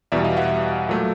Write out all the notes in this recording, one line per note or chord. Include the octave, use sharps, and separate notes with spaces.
E2 B2 G3 D5 E5
D#5 F5
E5 F#5
A#2 F#3 A3